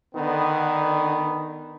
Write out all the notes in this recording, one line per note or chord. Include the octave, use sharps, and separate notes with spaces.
D3 D#3 B3